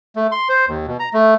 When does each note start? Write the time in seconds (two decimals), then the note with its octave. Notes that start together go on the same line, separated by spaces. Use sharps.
0.16 A3
0.32 C6
0.49 C5
0.68 D#2
0.87 B2
1.00 A#5
1.13 A3